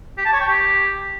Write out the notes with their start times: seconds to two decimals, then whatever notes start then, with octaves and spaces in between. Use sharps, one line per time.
0.18 G4
0.25 A5
0.33 C#5
0.41 G5
0.48 G4